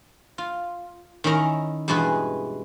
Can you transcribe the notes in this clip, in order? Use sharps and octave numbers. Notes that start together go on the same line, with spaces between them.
F4
D#3 C#4 E4 A#4 A#5
E2 G2 B2 G#3 G#4 B4